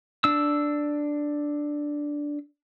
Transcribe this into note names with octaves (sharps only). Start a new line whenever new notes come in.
D4 E6